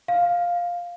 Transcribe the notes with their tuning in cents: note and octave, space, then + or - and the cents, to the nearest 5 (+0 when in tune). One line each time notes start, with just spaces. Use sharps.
F5 +5